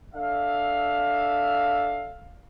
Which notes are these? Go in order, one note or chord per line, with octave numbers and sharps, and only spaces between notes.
D4 A4 E5 F5